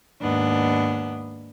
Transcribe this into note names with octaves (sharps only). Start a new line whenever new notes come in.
D#2 G#2 B3 D4